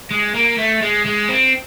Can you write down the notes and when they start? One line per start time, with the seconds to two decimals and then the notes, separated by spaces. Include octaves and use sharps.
0.11 G#3
0.35 A#3
0.58 A3
0.82 G#3
1.06 G#3
1.29 C4